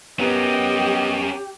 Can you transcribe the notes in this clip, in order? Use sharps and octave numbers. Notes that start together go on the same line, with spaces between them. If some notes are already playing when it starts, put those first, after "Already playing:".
B3 C#4 G4 A#4 D#5